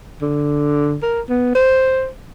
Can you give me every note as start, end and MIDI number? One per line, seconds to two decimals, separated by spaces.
0.22 0.98 50
1.03 1.21 70
1.30 1.54 59
1.55 2.08 72